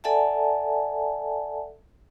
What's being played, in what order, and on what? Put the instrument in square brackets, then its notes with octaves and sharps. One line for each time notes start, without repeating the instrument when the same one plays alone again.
[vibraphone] A4 D5 E5 F#5 G#5 A5